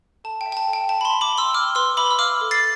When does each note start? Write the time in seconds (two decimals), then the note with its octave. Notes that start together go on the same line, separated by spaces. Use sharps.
0.24 A4 A5
0.41 G5
0.46 E5
0.52 G5
0.57 A5
0.68 A4
0.73 G5
0.89 E5 A5
1.01 B5
1.05 A5 C6
1.11 E5
1.21 B5 D6
1.32 G5
1.38 C6 E6
1.54 G5 D6 F6
1.75 B4 C6 E6
1.97 E5 B5 D6
2.11 E6
2.19 F5 D6 F6
2.41 A4
2.51 A6 C7